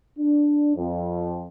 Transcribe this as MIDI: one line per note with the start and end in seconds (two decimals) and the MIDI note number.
0.19 0.72 62
0.76 1.46 41